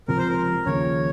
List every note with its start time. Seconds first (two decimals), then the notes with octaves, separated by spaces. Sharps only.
0.08 C#2 C3 F3 A#4
0.18 C5
0.28 A#4
0.66 D#2 C#3 F3 A#3 C#5